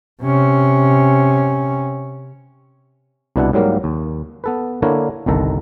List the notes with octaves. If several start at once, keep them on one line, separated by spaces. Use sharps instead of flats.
C3 C#4
C2 B2 D4 E4 D5 F#5
G#2 F#3 G3 A#3 A#4 F5
D#2
B3 A4 B4
D3 A#3 D4 E4 A#4 C#5
G1 C2 D#3 A4 A#5